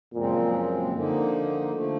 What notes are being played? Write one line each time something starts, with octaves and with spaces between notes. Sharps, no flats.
F#2 A#2 C#3 F3 G#3 C4
D3 F3 A#3 D#4
D3 F3 A3